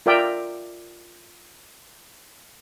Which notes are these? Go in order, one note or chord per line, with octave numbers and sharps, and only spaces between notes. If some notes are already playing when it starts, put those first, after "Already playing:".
F4 A#4 D5 E5 G5